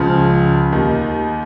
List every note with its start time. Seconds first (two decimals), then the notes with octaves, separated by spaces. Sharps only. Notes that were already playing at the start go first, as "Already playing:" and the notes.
Already playing: C#2 C#3 F3
0.72 D#2 D#3